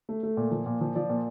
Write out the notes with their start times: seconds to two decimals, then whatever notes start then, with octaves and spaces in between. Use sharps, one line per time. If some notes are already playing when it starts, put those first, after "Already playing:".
0.09 A3
0.23 A3
0.37 A#2
0.51 F3
0.66 A#2
0.81 F3
0.95 F3 D5
1.09 A#2